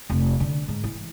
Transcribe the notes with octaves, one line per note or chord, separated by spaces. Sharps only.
F1
D3
G#2
E3